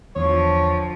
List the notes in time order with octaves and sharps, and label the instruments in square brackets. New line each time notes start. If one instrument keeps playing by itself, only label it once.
[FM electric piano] E2 [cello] D3 F3 [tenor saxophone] C#5